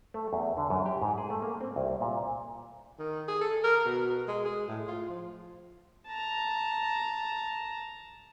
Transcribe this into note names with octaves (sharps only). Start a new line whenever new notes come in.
A3
E2
D3
F#2
G4
G#2
G#4
A3
A#3
C4
C2
A#2
D#3
G#4
A4
A#4
B2
G#3
G#4
A2
F4
F3
A5 A#5